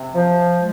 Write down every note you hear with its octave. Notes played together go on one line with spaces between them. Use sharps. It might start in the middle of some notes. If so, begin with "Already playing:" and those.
Already playing: C3
F3
G#3